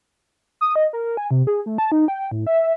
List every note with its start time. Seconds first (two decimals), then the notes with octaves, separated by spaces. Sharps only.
0.61 D#6
0.76 D#5
0.93 A#4
1.17 G#5
1.31 C3
1.47 G#4
1.66 A3
1.78 A5
1.92 D#4
2.08 G5
2.31 A2
2.47 E5